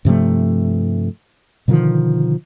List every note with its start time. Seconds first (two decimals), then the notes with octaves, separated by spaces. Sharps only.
0.05 G2 C3 F3 A3
1.68 B2 D3 D#3 F3